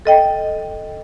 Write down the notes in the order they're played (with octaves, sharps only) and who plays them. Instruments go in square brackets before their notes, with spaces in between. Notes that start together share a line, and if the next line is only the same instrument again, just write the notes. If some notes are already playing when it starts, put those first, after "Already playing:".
[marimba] A4 D#5 G5